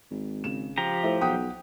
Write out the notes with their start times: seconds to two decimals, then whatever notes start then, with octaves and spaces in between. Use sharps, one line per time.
0.11 G#1
0.44 C#3 E7
0.78 F3 G4 A#5
1.04 A2 C5 E5
1.21 B1 F#5 G5 D#6